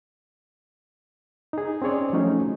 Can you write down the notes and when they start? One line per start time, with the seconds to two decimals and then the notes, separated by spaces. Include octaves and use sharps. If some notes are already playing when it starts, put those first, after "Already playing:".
1.53 D#4 G#4
1.82 C4 C#4 G#4 C#5 D5
2.13 F3 F#3 A3 C#4 D#4